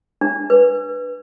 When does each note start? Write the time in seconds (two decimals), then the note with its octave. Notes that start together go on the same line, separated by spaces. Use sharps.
0.21 D4
0.50 B4